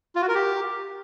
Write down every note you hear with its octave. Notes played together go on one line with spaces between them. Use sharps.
F4
F#4
A#4
G4